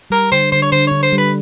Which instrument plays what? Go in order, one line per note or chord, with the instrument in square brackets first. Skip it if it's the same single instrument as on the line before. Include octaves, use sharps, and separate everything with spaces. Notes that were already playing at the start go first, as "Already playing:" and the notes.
[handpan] G3 [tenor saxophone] A#4
[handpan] D3 [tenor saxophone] C5
[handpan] D3 [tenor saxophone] C5
[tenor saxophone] C#5
[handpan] D3 [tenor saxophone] C5
[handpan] D3 [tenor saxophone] C#5
[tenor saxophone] C5
[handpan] G3
[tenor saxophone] B4